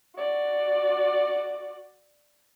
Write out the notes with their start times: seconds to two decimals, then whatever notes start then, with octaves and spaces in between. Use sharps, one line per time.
0.16 F#4 D5